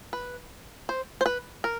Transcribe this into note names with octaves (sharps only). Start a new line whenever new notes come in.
B4
C5
C5
B4
A#4